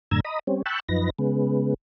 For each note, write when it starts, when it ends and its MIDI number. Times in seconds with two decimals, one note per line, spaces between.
0.11 0.20 42
0.11 0.20 45
0.11 0.20 50
0.11 0.20 82
0.11 0.20 88
0.11 0.20 92
0.25 0.39 75
0.25 0.39 82
0.25 0.39 83
0.25 0.39 87
0.47 0.62 55
0.47 0.62 60
0.47 0.62 61
0.66 0.80 79
0.66 0.80 81
0.66 0.80 83
0.66 0.80 85
0.66 0.80 88
0.66 0.80 90
0.89 1.10 42
0.89 1.10 53
0.89 1.10 63
0.89 1.10 71
0.89 1.10 94
1.19 1.74 49
1.19 1.74 56
1.19 1.74 59